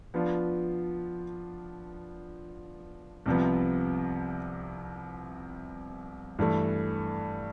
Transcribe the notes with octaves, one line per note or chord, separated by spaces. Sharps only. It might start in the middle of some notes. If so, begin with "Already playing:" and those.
F3 B3 D4 F4
C2 C3 F3 B3
G2 E3 A3